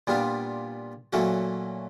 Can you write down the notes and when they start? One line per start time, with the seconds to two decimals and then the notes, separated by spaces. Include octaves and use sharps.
0.07 A#2 G3 B3 D4 F4
1.13 A#2 F#3 A3 C#4 F#4